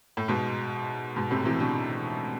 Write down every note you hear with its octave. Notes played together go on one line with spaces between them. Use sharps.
A2
G#2 B2
G#2 B2
A2 C3
C3 E3
B2 D3